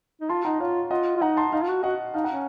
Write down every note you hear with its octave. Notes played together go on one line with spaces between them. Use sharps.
D#4
F4 A5 C6
D#4 F#5 A#5
F4 C#5 F5
F4 D#5 F#5
F4
D#4 F#5 A#5
A5 C6
D#4 F5 A5
F4
F#4
F#4 D#5 F#5
D#4 F5 A5
F#5 A#5
C#4